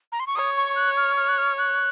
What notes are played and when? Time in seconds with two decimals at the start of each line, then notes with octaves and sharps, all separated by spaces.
0.12 A#5
0.20 C6
0.27 C#6
0.36 C#5 D#6
0.56 C#6
0.76 F#6
0.97 F6
1.17 F6
1.29 F#6
1.38 F6
1.58 F#6